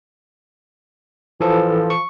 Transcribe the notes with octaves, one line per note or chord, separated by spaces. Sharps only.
E3 F3 A4
C#6